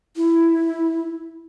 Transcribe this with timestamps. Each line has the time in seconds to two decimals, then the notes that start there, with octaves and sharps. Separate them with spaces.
0.17 E4